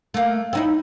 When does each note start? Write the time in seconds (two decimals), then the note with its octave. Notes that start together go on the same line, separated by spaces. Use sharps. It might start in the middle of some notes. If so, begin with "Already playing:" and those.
0.14 A3 A#3
0.53 C4 D#4 E4